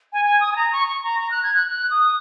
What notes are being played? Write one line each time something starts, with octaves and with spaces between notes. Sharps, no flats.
G#5
G#5
D#6
G#5
A#5
C#6
C#6
A#5
A#5
F#6
G#6
F#6
F#6
D#6